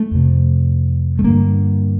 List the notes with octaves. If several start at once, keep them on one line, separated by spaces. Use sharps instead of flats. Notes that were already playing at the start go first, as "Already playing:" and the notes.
Already playing: A3
F2 C3
A3
G2 D3 A#3